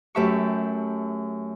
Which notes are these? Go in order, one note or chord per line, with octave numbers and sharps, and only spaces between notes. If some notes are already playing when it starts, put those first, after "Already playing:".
F#2 A3 G4 E5 A5 C#6